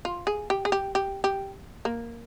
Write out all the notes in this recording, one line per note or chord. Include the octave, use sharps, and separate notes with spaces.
F4
G#4
G4
G#4
G4
G4
G4
A#3